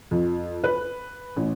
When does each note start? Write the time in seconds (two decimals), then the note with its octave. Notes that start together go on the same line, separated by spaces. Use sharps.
0.11 F2
0.64 B4
1.36 A1